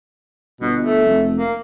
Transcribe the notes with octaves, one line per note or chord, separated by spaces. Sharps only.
G1 B2
A3
F1
A#3